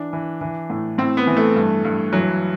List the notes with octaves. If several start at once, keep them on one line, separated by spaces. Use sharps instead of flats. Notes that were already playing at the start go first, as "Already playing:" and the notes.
Already playing: E3 D4
E3
E3
A2
A2 C4
B3
E3
A3
G2
G2
E3 F#3